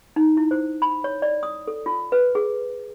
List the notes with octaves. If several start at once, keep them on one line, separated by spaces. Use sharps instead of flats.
D#4
E4
C5
B5
C#5
D5
D#6
A4
F4
B4
G#4